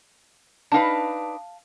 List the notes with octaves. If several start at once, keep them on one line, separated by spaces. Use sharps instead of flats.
D4 D#4 B4 F5 A5